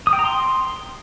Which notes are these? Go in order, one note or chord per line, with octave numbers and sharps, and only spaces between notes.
D#6
G5
A#5
C6